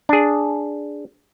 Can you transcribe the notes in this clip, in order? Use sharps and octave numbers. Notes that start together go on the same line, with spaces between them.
D4 G#4